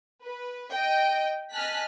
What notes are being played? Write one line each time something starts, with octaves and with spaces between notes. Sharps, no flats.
B4
D#5 G5
D#5 G#5 A5 F6 F#6 B6